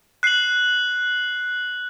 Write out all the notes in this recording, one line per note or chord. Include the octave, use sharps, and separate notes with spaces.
F#6 C7 F#7